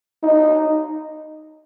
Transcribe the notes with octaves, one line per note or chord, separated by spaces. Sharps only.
D#4